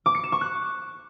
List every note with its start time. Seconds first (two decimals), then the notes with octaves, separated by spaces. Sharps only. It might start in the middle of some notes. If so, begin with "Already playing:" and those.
0.06 D6
0.15 C#7
0.24 E7
0.32 C#6
0.41 F#6